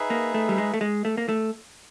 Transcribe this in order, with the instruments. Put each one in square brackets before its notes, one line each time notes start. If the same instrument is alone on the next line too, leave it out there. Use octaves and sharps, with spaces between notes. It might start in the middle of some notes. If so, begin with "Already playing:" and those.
Already playing: [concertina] D#4 G#4 B4 E5
[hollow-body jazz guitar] A#3
A3
G3
G#3
A3
G#3
A3
A#3
A3